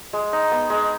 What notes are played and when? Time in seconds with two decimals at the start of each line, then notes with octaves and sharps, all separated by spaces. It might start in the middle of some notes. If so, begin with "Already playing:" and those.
0.13 G#3
0.33 D#4
0.51 B3
0.70 G#3